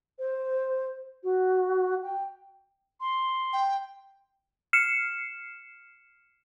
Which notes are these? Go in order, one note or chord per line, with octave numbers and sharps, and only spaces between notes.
C5
F#4
G5
C6
G5
F6 C7 C#7 E7